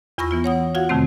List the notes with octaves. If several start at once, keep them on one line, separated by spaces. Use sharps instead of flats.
E2 F4 B5 C#6 E6 A#6
E3 B3 F4
C#5 F#5 D#6
F4 F#4 F5 F#5 G#6
F2 C3 D#3 A3 C4